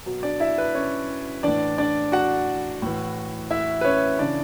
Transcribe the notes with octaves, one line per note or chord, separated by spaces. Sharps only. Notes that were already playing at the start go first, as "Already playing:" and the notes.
B2 F#3
D4 D5
E4 E5
B4
C#4 C#5
A2 E3 D4 D5
D4 D5
F#4 F#5
A2 E3
E4 E5
B4
C#4 C#5
C#3 E3 D4 D5